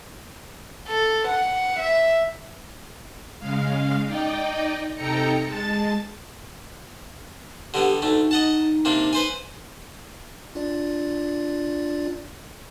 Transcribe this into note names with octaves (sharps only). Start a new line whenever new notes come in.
A4
F#5
E5
C#3 G#3 F5
D#4 D5 D#5 G5
C3 D#4 A4 G5 A#5 C#7
G#3 A5 A6
D3 G3 B3 G4
D2 A3 D#4
D#5 F#5 A5
C3 A#3 D4
B4 C5 G#5
D4 F4 D5